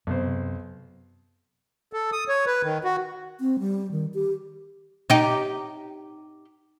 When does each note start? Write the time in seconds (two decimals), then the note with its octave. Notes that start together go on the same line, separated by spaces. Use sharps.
0.07 B1 F#2 C3 C5
1.93 A4
2.12 D#6
2.29 C#5
2.46 B4
2.63 D#3
2.84 F#4
3.40 C4
3.59 G3
3.91 D#3
4.14 G4
5.10 D#4 G4